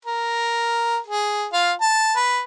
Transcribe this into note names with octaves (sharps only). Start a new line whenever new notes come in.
A#4
G#4
F4 F5
A5
B4